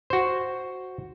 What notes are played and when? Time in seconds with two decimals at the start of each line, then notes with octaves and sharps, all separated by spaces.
0.10 F#4 C5